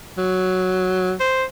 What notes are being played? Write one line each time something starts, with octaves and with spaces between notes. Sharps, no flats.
F#3
C5